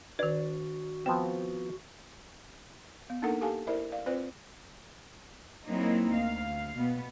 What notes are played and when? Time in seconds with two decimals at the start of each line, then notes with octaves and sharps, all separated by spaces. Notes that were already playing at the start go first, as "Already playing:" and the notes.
0.19 D#3 D4 F#4 B4 D5
1.06 F3 B3 C4 G5
3.10 B3
3.22 A#3 D4 D#4 A4 A#4 F#5
3.41 G4 A4 F5 G#5 A5
3.67 E4 A#4 C5 D5 E5
3.92 D5 F5
4.06 C4 F4 B4 C5 D5
5.67 F#3 A#3 C4 D#4 E4
6.11 D2 F5
6.76 B2 B3